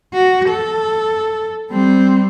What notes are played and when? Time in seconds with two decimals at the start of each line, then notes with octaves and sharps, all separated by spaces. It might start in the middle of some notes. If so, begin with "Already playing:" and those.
0.14 F#4
0.49 A4
1.71 G3 C4